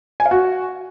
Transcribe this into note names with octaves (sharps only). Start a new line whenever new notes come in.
G#5
F5
F#4